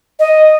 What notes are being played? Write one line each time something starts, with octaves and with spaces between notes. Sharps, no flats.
D#5